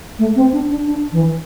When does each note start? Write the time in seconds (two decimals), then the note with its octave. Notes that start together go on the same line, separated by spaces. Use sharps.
0.19 A3
0.36 C4
0.53 D4
0.70 D4
0.87 D4
1.12 E3